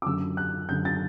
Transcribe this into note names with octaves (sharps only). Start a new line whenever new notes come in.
D6
F#2 D3 F#3 E6
F#6
F#2 D3 F#3 G6
A6